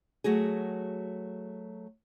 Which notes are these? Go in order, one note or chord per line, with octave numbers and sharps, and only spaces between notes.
F#3 A3 F#4 G#4